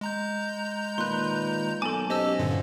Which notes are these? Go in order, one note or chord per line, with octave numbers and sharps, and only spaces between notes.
G#3 A#5 G6
A#2 D#3 B4 C6 F#6
B1 A#3 A4 G#5 A5 D6
C#4 G4 C5 D#5 A5 E6
G2 A#2 D3